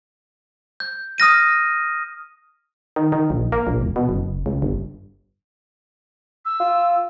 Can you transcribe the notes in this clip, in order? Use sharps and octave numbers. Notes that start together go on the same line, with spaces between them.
G6
D#6 F6 A#6 D#7
D#3
D#3
A#1
A#3
A#1
E1
B2
F#1
C#2
G1
E6
F4